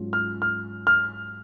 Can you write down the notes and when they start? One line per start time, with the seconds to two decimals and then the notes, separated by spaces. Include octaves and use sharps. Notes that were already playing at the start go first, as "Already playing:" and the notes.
Already playing: G#2 F#3 C#4 F4
0.13 F6
0.42 F6
0.87 F6